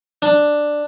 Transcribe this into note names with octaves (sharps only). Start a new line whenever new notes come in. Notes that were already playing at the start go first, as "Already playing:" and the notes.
D4